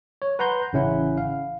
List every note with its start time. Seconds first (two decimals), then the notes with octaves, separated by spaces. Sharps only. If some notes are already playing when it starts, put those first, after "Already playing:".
0.22 C#5
0.39 B4 F#5 A#5 C6 G6
0.73 A1 C#3 C#4 E4 F#5
1.18 F5